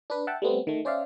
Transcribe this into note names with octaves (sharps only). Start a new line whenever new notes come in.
D4 B4
E5 F#5 G5 A5
G3 A3 B3 C4
D#3 A3
C#4 C5 D5 E5 F5